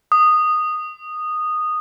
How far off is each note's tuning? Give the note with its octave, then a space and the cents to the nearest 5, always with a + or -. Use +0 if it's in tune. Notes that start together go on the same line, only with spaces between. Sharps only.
D#6 -10